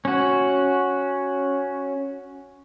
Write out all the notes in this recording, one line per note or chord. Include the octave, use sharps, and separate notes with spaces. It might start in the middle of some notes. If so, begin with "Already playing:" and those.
C#4 F#4